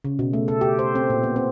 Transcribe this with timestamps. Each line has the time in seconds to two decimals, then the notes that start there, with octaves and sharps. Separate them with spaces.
0.04 C#3
0.19 B2
0.33 A3
0.48 A4
0.61 G4
0.79 C5
0.95 C4
1.10 A#2
1.23 B3
1.36 C4